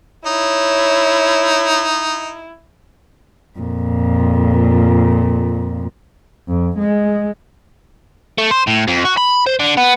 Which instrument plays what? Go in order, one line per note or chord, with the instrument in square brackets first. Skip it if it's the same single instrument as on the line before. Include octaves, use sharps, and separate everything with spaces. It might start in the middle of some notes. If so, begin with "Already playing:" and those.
[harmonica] D#4 [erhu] E4 [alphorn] C#5
[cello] F2 A#2
[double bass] F2
G#3
[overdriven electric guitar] A3
C5
A2
F2
F#4
B5
C5
D3
B3